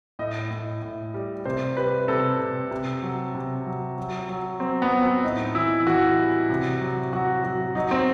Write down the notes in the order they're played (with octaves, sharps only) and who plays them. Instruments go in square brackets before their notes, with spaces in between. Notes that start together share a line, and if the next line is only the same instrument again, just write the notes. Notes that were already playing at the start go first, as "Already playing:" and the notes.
[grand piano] A2 D#5
A2
A2
G3
C3 C5
G3 B4
C3 A4
C3
C3
F#3
C3
F#3
F#3
F#3
F#3 C4
B3
F#3
C4
A2 D#4
E3 E4
E3 F#4
G3
C3
F#3
F#3 F#4
F#3 F#4
F#3 D#4
C4